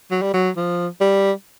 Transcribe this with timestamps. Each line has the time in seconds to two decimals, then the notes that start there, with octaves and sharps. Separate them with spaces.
0.11 F#3
0.22 G3
0.34 F#3
0.56 F3
1.01 G3